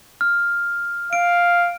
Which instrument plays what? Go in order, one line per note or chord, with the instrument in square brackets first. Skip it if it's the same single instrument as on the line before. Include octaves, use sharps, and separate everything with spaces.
[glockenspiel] F6
[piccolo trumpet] F5 [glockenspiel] D7